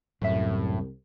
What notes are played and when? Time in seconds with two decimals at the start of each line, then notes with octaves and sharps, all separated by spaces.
0.22 C2 F#2 A2 E5